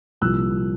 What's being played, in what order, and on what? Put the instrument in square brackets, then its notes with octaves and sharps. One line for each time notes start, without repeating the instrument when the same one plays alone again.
[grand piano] C2 A#2 F3 E6 F#6